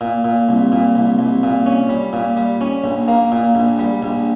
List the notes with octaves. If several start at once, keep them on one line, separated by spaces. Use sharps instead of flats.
A#2
A#2
C2
A#2
C2
C2
A#2
C#4
G3
A#2
G3
C#4
A#1
A#3
A#2
A#1
G3
A#1